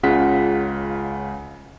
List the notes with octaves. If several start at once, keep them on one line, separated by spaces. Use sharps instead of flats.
C#2 C#3 F4 F#5 B6